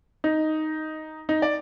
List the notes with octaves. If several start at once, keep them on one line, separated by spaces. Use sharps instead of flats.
D#4
D#4
D5